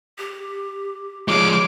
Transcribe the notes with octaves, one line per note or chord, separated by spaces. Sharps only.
G4
F3 G#3 C#5 D6